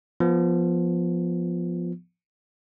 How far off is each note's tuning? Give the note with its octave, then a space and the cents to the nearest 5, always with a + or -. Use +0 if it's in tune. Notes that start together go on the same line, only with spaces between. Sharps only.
F3 +0 B3 -10